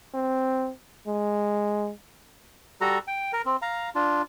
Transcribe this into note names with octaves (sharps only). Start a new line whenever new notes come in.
C4
G#3
G3 F#4 A4 A#5
G5
A#4
C4
F5 A#5
D4 F4